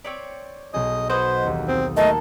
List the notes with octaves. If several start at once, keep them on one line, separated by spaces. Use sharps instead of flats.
C4 C#5 D5 B6
B1 G#4 D#5
F#4 B4 C5 D#5 G6 G#6
E1 D#2
C4 D#6
A3 A#3 F#4 A4 A#4 D#5 A5